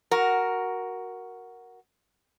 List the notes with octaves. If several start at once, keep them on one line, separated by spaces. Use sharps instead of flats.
F#4 A#4